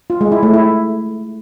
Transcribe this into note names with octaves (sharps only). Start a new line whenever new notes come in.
F4
G#3
E4
A3
E4